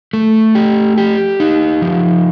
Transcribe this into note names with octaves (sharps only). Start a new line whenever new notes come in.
A3
G4
G4
D#4
F3